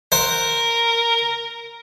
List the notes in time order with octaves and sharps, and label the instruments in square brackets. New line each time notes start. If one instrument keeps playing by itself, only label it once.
[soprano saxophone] A#4 [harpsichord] C5 F#5